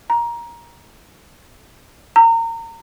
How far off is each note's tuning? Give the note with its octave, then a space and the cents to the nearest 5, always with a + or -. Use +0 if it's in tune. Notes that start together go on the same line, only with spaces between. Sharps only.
A#5 +15
A#5 -30